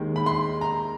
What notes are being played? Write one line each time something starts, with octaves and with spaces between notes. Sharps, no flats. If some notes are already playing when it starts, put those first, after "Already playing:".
Already playing: D#2 D#3 G#3
B5
C6
A#5